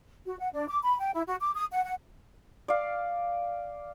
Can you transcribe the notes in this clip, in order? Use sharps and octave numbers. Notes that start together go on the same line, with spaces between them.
F#4
F#5
D4
D6
B5
G5
E4
F#4
D6
D#6
F#5
F#5
D5 F5